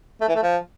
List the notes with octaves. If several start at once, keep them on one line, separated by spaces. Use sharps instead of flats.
A3
E3
A3
F3